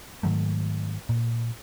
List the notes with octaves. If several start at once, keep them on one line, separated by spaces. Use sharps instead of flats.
G#2 D#3 F#3 A3
A#2